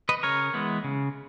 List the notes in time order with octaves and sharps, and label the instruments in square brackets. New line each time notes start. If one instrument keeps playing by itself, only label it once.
[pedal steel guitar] B4 D#5
C#3 A#4 C#5
E3 G#3 B3
C#3